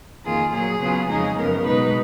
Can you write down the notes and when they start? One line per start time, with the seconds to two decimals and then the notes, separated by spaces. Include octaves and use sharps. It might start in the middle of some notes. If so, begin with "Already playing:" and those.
0.24 F2 D#3 A#3 F4 G#4
0.52 A#2 F#3 A#3 G#4
0.80 C#3 F#3 B3 F4
1.08 F2 C#3 F3 G#3 D#4 G#4
1.36 F#2 C#3 F3 B3 A#4
1.64 B2 G#3 D#4 B4